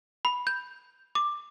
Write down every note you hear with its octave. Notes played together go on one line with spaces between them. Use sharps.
B5
G6
D6